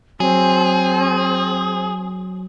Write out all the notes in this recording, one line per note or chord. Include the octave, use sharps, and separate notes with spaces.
F#3 C4 G#4